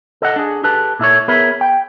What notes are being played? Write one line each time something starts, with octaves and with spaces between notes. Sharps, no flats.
A4 D#5 F#5
D4 G#4
G4 A4 B4 A5
A#2 E4 A4 C#5
B3 G#4 A#4 B4 C#5 E5
G5